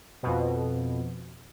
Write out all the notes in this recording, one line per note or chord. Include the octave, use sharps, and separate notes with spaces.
F2 B2